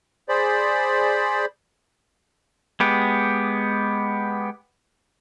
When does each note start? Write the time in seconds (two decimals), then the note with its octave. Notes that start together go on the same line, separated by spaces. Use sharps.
0.29 G#4 C5 D5 B5
2.80 G#3 B3 G4